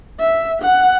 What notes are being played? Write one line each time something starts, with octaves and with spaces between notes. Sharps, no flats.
E5
F#5